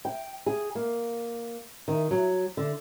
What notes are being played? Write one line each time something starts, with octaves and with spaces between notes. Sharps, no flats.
G5
G#4
A#3
D#3
F#3
D3